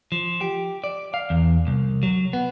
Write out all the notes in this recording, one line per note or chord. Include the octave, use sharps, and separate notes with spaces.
F3
G4
D5
F5
E2
C2
F#3
B3